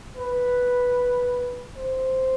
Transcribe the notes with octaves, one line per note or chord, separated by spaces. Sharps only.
B4
C5